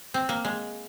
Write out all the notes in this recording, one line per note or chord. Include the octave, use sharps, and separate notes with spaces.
C4
A#3
G#3